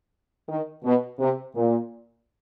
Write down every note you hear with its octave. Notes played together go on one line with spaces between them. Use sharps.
D#3
B2
C3
A#2